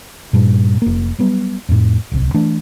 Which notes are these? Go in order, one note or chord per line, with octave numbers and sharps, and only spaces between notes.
G2 A#2
F1 A#3
F#3 G3 B3
F2 A2
D1 C2
E3 A3 D4